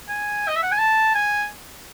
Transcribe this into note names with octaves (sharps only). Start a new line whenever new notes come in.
G#5
D#5
E5
F#5
G#5
A5
G#5